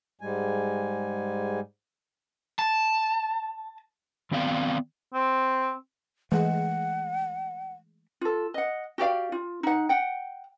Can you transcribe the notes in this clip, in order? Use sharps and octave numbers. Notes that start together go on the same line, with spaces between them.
G#2 G3 G#3 G#5
A5
D#3 B3 C4 D5 F5 G5
C4
E3 G#3 A3 F#5
F4 A4
D#5 F#5
F#4 G4 D5 F5
F4
D#4 F#5
F#5 G5